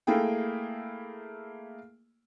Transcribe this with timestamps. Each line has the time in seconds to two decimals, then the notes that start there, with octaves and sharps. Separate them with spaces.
0.07 A3 A#3 E4 G#4 G5